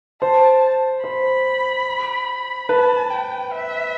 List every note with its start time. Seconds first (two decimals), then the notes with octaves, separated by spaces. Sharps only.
0.21 C5 A5
1.04 C5 B5
2.69 B4 A5
3.10 G5
3.51 E5